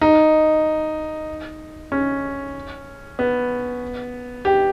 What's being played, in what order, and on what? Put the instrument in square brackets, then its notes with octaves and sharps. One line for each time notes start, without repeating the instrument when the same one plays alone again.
[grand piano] D#4
C#4
B3
G4